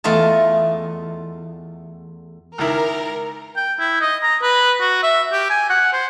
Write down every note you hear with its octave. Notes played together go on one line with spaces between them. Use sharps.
E2 A3 F4 D#5 A5
C#2 D#3 E4 A#4
G5
E4
D#5
A#5
B4
F#4
E5
G4
G#5
F#5
C5